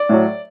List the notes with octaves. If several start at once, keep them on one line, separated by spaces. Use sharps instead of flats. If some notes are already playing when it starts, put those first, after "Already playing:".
Already playing: D5
A2 F#3